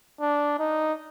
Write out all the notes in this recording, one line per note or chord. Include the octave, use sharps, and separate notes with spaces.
D4
D#4